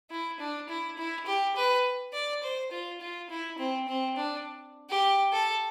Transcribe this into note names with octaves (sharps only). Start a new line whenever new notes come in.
E4
D4
E4
E4
G4
B4
D5
C5
F4
F4
E4
C4
C4
D4
G4
A4